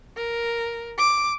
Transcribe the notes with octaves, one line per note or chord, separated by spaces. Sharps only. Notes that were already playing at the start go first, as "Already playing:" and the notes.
A#4
D6